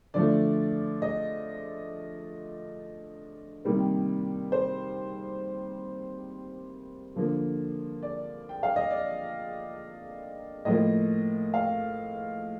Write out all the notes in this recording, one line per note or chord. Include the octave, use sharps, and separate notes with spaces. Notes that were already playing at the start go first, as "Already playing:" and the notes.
D3 F3 A3 D5
D#5
C3 D#3 G3 A#3
C5
D3 F3 A#3
D5
G5
F5
D#5
D5
A2 F3 A#3 D#5
F5